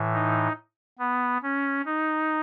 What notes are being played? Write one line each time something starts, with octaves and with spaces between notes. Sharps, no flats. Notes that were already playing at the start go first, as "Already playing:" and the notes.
Already playing: A2 E3
D#4
B3
C#4
D#4